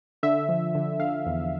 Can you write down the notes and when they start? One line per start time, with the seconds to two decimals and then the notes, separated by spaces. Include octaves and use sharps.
0.23 D3 E5
0.49 F3
0.75 D3
0.99 D3 F5
1.26 E2